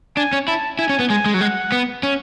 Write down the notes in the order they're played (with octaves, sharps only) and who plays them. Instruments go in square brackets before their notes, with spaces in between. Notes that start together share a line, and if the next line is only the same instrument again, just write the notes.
[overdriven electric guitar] D4 [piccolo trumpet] G#5
[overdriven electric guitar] C#4
[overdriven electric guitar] E4 [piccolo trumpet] A5
[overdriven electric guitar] E4 [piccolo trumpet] G#5
[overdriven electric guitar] C#4
B3
[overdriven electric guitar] G#3 [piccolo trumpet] G#5
[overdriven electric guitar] G#3
F#3
[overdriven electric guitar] G#3 [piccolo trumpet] F#5
[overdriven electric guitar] B3
C#4